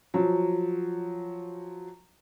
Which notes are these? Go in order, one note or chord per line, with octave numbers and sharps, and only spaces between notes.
F3 F#3